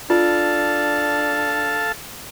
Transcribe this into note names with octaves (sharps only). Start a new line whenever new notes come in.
D4 F4 A4 F5 A5